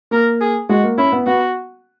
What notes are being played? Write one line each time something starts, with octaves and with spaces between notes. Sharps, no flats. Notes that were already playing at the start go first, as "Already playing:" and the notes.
A#3 A#4
G#4
G#3 F#4
A#3
C#4 E4
B3
B3 F#4